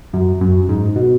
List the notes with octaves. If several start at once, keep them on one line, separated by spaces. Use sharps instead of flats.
F#2
F#2
G#2
B2